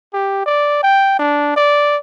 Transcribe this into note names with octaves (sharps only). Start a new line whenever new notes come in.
G4
D5
G5
D4
D5